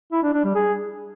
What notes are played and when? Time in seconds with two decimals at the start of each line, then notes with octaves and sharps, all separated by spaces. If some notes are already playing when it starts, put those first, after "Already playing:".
0.12 E4
0.23 D4
0.33 D4
0.44 G3
0.55 G#4